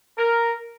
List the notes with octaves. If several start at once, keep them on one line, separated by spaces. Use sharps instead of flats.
A#4